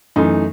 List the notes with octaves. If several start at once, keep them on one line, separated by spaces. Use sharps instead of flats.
F#2 E3 A3 D#4